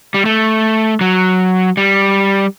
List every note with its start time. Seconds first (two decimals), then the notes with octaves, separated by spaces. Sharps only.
0.14 G3
0.25 A3
1.01 F#3
1.77 G3